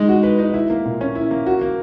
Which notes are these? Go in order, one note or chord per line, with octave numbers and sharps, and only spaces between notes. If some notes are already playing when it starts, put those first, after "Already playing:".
Already playing: G#3 D#4
F#4
B4
D#4
E4
A#3
A#2
C#4
E4
A#3
F#4
A#3